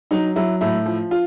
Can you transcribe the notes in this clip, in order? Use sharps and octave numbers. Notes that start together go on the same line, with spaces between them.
F#3 D#4
F#3 E4
A2 E4
F3
F4